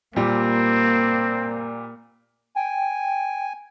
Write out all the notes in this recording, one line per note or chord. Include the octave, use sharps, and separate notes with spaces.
A#2 G3 A#3 C4
G5 G#5